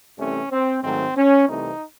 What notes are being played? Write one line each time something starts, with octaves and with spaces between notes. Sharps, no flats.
C2 C3 E3 A3 C#4
C4
G#2 D#3 F#3 A3 C4
C#4
C2 C3 E3 A3 D#4